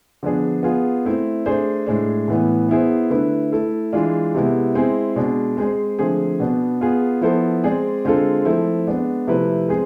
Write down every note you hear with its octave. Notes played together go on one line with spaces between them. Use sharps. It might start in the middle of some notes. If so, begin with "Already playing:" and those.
D3 F3 B3 D4 G#4
B3 F4 G#4
A3 C4 E4
A3 D4 G#4 C5
A2 G#3 D4
A2 E3 B3
B3 E4 G#4 C5
D3 A3 E4 B4
A3 E4 A4
E3 G#3 D4 F4
C3 G#3 B3 E4
G#3 C4 E4 G#4
B2 G#3 D4
G#3 C4 G#4 C5
D3 F3 A3 C4 G#4
B2 B3 D4
B3 F4 G#4
F3 B3 E4 A4 C5
G#3 C4 G#4 D5
D3 G#3 C4 F4 A4
F3 A3 C4 E4 A4
G#3 B3 D4
C3 F3 A3 E4 B4
G#3 C4 G#4